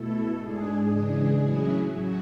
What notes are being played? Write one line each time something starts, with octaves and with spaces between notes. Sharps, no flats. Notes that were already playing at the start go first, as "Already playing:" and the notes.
Already playing: B2 A3 E4 A4
G#2 G#3 D4 G#4
C#3 E3 G#3 D4
A2 F#3 C#4 E4
C#3 F#3 F#4